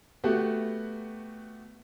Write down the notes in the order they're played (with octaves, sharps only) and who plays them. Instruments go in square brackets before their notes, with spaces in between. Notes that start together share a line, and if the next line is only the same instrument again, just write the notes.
[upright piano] A3 B3 F#4 G4